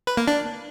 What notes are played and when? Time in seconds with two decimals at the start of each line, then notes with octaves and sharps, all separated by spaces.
0.07 B4
0.17 A#3
0.28 D4